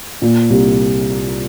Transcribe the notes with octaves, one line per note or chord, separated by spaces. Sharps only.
A#2
C2